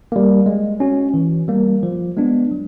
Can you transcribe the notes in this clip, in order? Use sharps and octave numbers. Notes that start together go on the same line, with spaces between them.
G3 A#3
G#3
C#4 F#4
E3
G3 A#3
F3
G#3 B3 D4
F#3